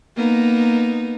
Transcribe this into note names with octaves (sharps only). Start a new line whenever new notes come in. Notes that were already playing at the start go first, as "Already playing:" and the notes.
A#3 B3 D#4